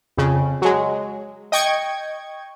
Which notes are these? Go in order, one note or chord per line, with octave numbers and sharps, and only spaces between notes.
F2 C#3
F#3 G#3
D#5 G5 C#6 G#6